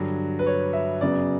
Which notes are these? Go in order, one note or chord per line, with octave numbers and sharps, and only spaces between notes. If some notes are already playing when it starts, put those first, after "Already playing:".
Already playing: G2 D3 F#3
B4
C#5
E5
F#2 C#3 F#3 B3 D5